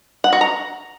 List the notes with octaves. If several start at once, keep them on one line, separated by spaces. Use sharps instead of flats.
F#5
F#4
A#5